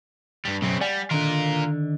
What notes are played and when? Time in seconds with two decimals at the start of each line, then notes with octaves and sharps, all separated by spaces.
0.45 G2 G3
0.62 B1 F#2 C#3 C4
0.81 G3 D5 F#5 G#5
1.11 D3 D#3 F4 A#4